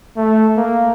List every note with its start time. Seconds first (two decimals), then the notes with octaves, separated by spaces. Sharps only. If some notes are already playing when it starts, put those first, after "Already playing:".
0.17 A3
0.57 A#3